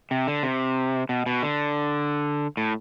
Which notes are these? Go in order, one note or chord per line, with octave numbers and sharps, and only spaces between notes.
C3
D3
C3
B2
B2
D3
A2